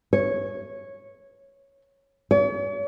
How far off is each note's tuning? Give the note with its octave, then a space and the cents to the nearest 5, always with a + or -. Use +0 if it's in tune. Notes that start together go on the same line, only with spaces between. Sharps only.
C#5 -10
C#5 +45